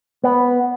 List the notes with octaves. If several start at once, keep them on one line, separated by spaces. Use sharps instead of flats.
B3